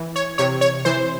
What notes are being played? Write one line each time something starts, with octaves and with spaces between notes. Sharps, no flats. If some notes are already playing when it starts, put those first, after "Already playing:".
Already playing: E3
C#5
C3 C#5
C#5
E3 C5